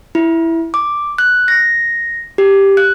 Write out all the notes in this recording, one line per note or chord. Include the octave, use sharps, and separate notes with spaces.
E4
D6
F#6
A#6
G4
F#6